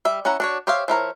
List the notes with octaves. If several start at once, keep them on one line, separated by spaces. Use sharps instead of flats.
G3 E5
C#4 E4 F#5 A#5
D4 F#4 C#5
G4 C5 C#5 E5 F5
F3 E4 A#4 C#5